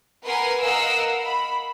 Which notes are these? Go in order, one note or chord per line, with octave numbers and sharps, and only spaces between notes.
A#4 B4 F#5 G#5 C6
A#4 D#5 F5 F#5 E6
B5